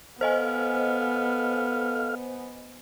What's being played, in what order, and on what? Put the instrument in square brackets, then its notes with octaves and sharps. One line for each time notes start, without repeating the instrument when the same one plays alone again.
[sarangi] B3 [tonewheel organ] A4 F5 F6 [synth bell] C5 D#5 G#5